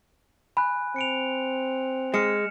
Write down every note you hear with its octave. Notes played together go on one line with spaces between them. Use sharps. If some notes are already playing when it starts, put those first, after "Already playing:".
G#5 B5 F#6
C4 C#7 D7 F7
G#3 F6 C#7 E7